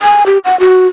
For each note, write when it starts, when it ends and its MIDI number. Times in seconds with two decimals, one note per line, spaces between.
0.02 0.24 80
0.26 0.38 67
0.45 0.58 78
0.60 0.87 66